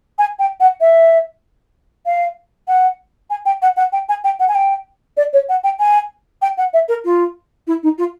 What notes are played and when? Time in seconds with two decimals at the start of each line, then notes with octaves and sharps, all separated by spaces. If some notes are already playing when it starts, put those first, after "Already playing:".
0.19 G#5
0.39 G5
0.60 F#5
0.81 E5
2.06 F5
2.68 F#5
3.30 G#5
3.46 G5
3.62 F#5
3.77 F#5
3.93 G5
4.09 G#5
4.24 G5
4.40 F#5
4.49 G#5
4.55 G5
5.17 D5
5.33 C#5
5.49 F#5
5.64 G5
5.80 G#5
6.42 G5
6.58 F#5
6.73 E5
6.89 A#4
7.05 F4
7.67 E4
7.83 D#4
7.98 F4